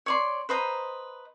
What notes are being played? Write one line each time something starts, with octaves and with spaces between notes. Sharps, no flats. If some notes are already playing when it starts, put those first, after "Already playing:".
C#5 D5 C6
B4 C5 D#5 A#5